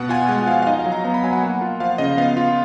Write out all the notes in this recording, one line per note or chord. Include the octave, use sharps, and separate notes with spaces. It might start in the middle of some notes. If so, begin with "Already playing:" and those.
Already playing: B2 B3 F#5
F4 G#5
G#3 F#5
F3 F5
F5
D#4 D#5
F5
F#3
A#5
B3 A#5
B5
F#3 G#5
F#5
A#3
F4
F3 F5
C#3 D#5
B3 F5
F4